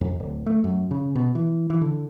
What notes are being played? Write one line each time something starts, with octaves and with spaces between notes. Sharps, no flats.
F2
D1
A3
F#2
C#3
B2
E3
E3
D3